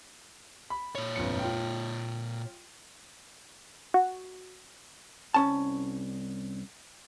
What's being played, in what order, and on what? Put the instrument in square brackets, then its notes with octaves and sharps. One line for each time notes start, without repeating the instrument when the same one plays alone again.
[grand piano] B5
[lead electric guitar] A#2 C#5
[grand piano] G1 F2 C#7
F4 G5
[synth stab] F#4
[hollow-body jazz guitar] C2 C#4 A5